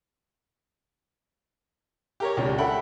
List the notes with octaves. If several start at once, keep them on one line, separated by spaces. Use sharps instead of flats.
G4 A#4 C#5
C#2 C3 D4
A4 E5 F#5 G5 B5